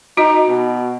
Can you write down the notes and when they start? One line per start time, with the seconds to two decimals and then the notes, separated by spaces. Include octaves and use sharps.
0.17 D#4 F#4 D#5
0.48 B2